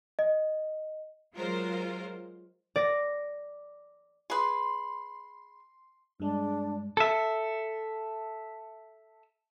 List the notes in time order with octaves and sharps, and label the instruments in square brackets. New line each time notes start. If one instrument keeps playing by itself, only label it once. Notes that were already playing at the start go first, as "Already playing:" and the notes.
[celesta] D#5
[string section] F#3 G#3 F4 A#4 C5
[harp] D5 A#6
[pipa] G#4 B4 [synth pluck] C6
[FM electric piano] G2 G#3 [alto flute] D4
[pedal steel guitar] A4 E5